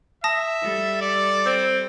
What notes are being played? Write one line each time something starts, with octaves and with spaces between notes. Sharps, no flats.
E5 A5 D#6 A#6
G3 A4
D5
C4